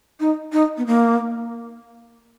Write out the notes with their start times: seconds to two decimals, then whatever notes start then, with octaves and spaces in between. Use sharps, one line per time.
0.20 D#4
0.53 D#4
0.78 B3
0.87 A#3